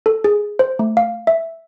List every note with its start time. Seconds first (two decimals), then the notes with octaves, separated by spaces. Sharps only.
0.06 A4
0.24 G#4
0.59 C5
0.79 A3
0.97 F5
1.27 E5